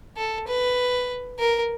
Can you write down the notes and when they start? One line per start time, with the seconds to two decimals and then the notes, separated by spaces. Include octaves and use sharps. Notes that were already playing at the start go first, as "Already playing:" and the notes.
0.17 A4
0.48 B4
1.39 A#4